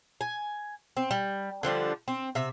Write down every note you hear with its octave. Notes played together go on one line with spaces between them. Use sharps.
G#5
C4
G3
D3 F3 G3 D4
C4
C3 E5